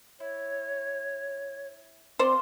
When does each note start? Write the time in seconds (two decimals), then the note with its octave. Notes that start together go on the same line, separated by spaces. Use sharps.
0.20 E4 C#5
2.19 C4 F4 C5 D5 C6